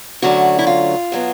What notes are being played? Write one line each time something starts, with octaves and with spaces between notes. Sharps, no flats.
D2 D3 F#3 A3 C#4 F#4
E4
F4
B2 F#3 B3